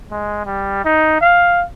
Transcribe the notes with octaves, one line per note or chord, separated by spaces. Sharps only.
G#3
G3
D#4
F5